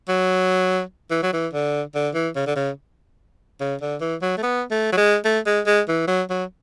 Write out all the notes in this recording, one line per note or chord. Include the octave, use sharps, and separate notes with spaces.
F#3
E3
F#3
E3
D3
D3
E3
C#3
D3
C#3
C#3
D3
E3
F#3
A3
B3
A3
F#3
G#3
A3
G#3
G#3
E3
F#3
F#3